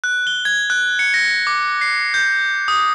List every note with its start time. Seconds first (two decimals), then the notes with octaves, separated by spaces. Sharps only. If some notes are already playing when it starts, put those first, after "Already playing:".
0.04 F#6
0.27 G7
0.45 G#6
0.70 F#6
0.99 C#7
1.14 A#6
1.47 D6
1.81 C7
2.14 G6
2.68 D#6